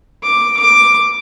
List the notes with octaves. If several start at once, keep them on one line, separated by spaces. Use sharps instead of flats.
D6
D6